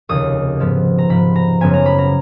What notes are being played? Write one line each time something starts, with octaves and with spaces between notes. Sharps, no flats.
F1 D#2 C#3 D#6
G#2 F3 B3
A#5
G#2 F3 B3 B5
A#5
F#1 F#2 C#3 F3 B3 G#5
A#5
B5
A#5